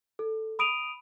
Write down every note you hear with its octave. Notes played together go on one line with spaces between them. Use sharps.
A4
B5 D#6 D7 D#7 F7